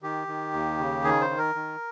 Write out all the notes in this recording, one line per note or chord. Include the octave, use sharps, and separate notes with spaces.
D#3 G4
D#3
D#2
C#3
D#3 G#4
C5
D#3
A#4
D#3